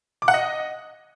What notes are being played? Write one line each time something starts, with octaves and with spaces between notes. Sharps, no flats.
D6
F#5
D#5